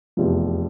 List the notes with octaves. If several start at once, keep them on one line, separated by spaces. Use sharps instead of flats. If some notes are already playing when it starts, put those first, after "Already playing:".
F1 E2 C3 F3